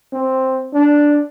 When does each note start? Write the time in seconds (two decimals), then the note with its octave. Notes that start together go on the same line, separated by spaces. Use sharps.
0.13 C4
0.74 D4